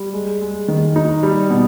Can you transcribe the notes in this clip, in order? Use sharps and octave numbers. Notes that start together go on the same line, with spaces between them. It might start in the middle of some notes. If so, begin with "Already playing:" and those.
Already playing: G3
G#3
G#3
D#3
D#4
G3
B2